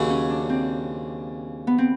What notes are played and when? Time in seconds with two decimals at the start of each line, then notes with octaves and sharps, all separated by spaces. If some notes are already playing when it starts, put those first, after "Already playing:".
Already playing: D#2 C#3 F#3
0.10 C#4
0.30 D4
0.50 C4
1.67 B3
1.78 C4